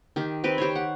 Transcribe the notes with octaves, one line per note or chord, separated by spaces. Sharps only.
D#3 G4
C4 G4 B4
G4 C5 C#5
F#5